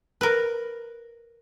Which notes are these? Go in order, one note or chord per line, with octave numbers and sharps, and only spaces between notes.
A#4 B4